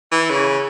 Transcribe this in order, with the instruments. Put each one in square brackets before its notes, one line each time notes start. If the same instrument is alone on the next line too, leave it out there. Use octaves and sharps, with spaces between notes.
[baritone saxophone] E3
C#3